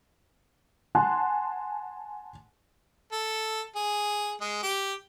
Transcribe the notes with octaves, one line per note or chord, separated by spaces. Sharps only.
F#5 G#5 A5 C6 F#6
A4
G#4
G#3
G4